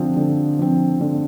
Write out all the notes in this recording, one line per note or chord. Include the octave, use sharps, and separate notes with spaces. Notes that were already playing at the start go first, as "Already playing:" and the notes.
Already playing: D3 F3 C4
D3
F3 C4
D3